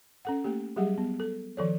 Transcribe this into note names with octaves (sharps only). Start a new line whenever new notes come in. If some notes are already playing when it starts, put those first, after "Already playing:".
C#4 A4 F#5
A3 A#3 G4
F#3 G3 G4 G#4 F#5
B3
A4
D#3 F3 A4 C#5